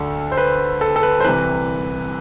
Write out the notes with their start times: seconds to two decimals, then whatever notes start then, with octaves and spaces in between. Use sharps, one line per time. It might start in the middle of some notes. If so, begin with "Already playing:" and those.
Already playing: D2 D3 A4
0.32 C5
0.37 B4
0.81 A4
0.96 A4
1.03 B4
1.20 C5
1.24 C2 C3 E3 B4